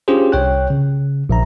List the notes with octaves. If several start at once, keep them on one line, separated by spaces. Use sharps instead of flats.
C#4 D4 F4 G4 G#4 C5
C2 C#5 G5 F#6
C#3
A#1 E5 A#5